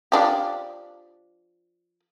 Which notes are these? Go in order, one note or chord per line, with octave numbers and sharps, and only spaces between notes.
F3 D4 G4